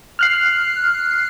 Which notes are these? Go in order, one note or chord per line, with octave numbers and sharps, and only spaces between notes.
F6 F#6 C7